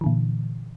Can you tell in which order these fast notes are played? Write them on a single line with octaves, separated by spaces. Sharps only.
E3 D3 A#2